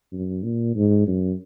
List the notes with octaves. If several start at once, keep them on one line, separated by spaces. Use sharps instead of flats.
F#2
A#2
G#2
F#2